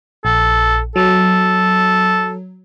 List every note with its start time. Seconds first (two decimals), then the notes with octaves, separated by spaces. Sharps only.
0.25 A#1 A4
0.96 F#3 A4